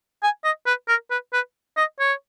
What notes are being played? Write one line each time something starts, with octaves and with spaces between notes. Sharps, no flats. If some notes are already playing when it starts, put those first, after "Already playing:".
G#5
D#5
B4
A#4
B4
B4
D#5
C#5